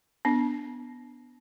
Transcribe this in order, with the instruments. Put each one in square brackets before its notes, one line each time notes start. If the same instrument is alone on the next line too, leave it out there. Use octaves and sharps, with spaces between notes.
[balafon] B3 D4